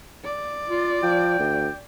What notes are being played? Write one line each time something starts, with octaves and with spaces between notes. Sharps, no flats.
D5
F4
F3 G5
D2